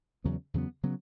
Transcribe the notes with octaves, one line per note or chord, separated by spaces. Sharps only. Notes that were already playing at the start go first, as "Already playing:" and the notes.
E2 C#3 F#3 B3
E2 C#3 F#3 B3
C#3 F#3 B3